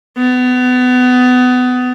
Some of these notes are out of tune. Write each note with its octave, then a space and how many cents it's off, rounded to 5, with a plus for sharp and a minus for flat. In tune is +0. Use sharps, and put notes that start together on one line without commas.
B3 +25